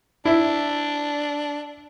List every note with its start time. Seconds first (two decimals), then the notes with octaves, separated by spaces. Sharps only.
0.25 D4 E4